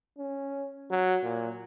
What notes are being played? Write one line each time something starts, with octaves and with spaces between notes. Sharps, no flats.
C#4
F#3
A#2